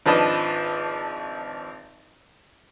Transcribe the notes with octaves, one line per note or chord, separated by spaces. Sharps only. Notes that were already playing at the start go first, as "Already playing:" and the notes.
G#1 F3 D4 B4 D#5 A5